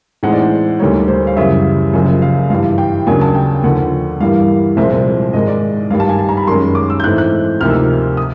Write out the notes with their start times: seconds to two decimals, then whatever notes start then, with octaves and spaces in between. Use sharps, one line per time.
0.23 A2 E3 G#3 C4 D#4 F#5
0.33 D5
0.42 C5
0.79 D2 D3 G3 A#3 D#4 C#5
1.08 C5
1.27 F5
1.36 F#2 C#3 E3 G3 E5
1.93 F#1 F#2 C#3 F3
2.22 F5
2.50 G2 E3 G3 F5
2.78 G5
3.06 D#2 C#3 F#3 A#3 D4 G#5
3.21 A5
3.35 G5
3.63 D#2 D3 F3 F#5
4.20 G2 E3 G3 A#3 F5
4.77 C2 A#2 F3 G#3 C4 E5
4.91 E5
5.33 G#2 D#3 G#3 D#5
5.48 D5
5.90 G2 D#3 G3 F5
6.00 A5
6.09 G#5
6.19 A5
6.29 A#5
6.37 B5
6.47 F#2 D#3 G#3 C#4 C6
6.75 D6
6.90 E6
7.00 G6
7.04 G#2 E3 A3 C4 F#6
7.18 F#6
7.61 D2 C3 F3 A#3 D#4 F6
7.70 E6
8.17 D#6